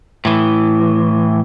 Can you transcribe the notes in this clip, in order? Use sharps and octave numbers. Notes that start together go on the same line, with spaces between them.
A2 E3